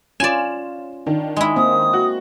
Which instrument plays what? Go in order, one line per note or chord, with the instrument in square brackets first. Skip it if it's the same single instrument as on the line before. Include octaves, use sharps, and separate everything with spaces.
[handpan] C#4 F4 [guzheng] D5 G#5 [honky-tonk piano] E7
[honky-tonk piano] D#3 [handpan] D4
[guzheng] G#3 E4
[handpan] A#3 C4 [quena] D#6
[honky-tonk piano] F#4